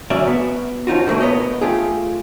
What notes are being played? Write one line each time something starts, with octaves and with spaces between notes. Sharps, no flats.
D2 F#3 C#4 D5 E5
B3
F3 C#4 D#4 F4 F#4
B2 D3 F#3 A3 A#3
B3 C#5 D#5
A3 F4 G4 G#4